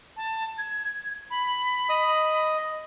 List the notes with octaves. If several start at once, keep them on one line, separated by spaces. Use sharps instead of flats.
A5
G#6
B5
D#5 D#6